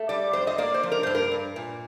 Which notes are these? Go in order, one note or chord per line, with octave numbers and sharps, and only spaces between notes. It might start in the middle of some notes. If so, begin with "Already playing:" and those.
Already playing: A3
G3 D5
F2 C5
D#5
A#3 D5
C5
F3
A#4
G2 C5
A#4
G2
A#2